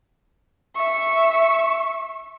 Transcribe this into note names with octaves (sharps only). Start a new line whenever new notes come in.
E5 C#6